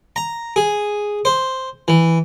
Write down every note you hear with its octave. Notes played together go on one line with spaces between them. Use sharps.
A#5
G#4
C5
E3